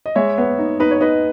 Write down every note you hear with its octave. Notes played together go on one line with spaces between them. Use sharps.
D#5
G#3 C#5 E5
B3
D#4
D#4 B4
C#5
D#4 B4 D#5